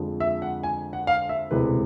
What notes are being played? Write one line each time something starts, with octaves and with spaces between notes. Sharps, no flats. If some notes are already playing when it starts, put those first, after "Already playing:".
Already playing: F2 D3 F3 G#3
E5
F#5
G#5
F#5
F5
E5
E1 D2 C3 E3 G#3 B4